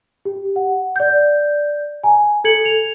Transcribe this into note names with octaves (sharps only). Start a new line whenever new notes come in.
G4
F#5
D5 G6
G#5 A#5
A4 G#6 C#7 F#7
F7